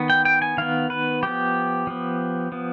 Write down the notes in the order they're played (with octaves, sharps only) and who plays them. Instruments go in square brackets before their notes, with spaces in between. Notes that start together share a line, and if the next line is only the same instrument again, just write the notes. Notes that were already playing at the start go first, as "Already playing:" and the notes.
Already playing: [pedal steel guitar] D#3 B3
G5
G5
G#5
D#3 B3 F5
B4
F3 B3 G4
F3 B3
F3 B3